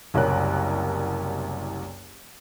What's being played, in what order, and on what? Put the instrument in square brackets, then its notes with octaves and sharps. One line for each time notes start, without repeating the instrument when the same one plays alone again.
[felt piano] F#1 C2 A#4 C#5 F#6